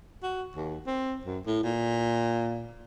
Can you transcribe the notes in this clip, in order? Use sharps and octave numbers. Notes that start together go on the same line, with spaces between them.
F#4
D#2
C4
F#2
A2
A#2